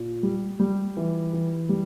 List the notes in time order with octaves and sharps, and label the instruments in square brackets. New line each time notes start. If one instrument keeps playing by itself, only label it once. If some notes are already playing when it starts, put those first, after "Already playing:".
Already playing: [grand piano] A#2
G3
G3
E3
E3
G3